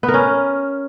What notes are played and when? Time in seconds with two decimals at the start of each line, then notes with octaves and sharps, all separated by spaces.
0.03 B3
0.08 A#4
0.14 C#4